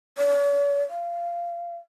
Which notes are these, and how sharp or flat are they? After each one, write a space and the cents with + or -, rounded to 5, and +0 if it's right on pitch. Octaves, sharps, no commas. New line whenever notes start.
C#5 +45
F5 -20